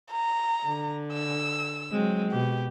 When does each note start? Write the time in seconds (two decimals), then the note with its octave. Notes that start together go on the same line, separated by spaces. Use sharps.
0.11 A#5
0.66 D3
1.13 E6
1.92 F#3 G#3 C4
2.31 B2 G4